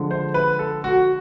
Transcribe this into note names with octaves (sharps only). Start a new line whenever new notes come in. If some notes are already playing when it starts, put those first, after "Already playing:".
Already playing: D3 F3 G#3
C5
B4
A4
F#4